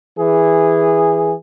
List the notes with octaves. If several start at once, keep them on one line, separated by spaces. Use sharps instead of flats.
E3 G#4